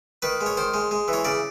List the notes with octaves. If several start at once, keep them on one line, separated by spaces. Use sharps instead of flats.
D#3 B4
G#3
C#5
D#3 C5
G#3
G#3
E3
C#5
C#3 D5